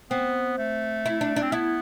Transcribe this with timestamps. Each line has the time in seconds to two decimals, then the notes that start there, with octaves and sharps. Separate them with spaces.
0.11 B3 C4
0.58 A3
1.06 E4
1.21 D4
1.36 D4
1.42 C4
1.52 B3 E4